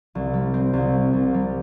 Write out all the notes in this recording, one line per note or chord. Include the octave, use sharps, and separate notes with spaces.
C2
G3
C4
C2
G3
C2
G3